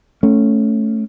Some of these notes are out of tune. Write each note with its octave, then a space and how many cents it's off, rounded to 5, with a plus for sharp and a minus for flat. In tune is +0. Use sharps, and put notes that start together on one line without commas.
A3 +0 C#4 +0